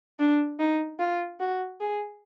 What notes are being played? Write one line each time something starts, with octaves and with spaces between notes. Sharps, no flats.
D4
D#4
F4
F#4
G#4